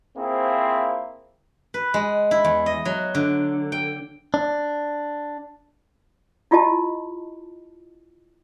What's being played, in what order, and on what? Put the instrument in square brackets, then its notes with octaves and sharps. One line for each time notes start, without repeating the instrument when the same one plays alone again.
[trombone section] A#3 C4 E4 F4 G#4 C5
[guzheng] B4
G#3
E4
E2
D#5
F#3
D3
G5
[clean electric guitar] D4
[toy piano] E4 F4 G4 D#5 A5